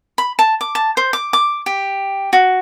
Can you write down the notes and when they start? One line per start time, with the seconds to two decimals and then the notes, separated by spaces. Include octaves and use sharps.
0.18 B5
0.39 A5
0.61 D6
0.75 A5
0.97 C5
1.13 D6
1.33 D6
1.66 G4
2.33 F#4